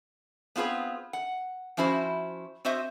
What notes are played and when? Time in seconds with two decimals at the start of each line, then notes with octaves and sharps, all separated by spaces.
0.56 B3 C4 F4 G#4 B4
1.13 F#5
1.77 F3 C#4 E4 F#4 C5
2.65 C4 F#4 C5 D#5 E5